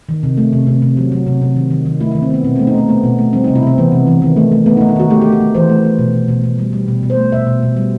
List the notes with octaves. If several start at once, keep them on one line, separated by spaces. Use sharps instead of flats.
D#3
C3
A3
C3
C3
C3
F#3
F#3
C3
C3
D#3
D#3
D#3
A3 E4
E4
D#3
C4
D#3 B3
B2 C4
C4
A3
D#4
A3 C4
A3 B3
B2
A3
G3 C4
D#4
C3
E4
C3 C4
E3 B3
C3
E3
D#3
A3
A3
A3 B3
D#4
A3
D#4
D#3 F#4
A3 G4
G4
A3
G4
A3
E3 C5
A3
A3
B2
B2
B2
B2
G3
G3
B2
B2
C5
A3
B2 E5
B2
B2
G3